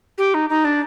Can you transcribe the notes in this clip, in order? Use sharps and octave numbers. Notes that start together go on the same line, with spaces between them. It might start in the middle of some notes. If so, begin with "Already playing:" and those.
G4
D#4
D#4
D4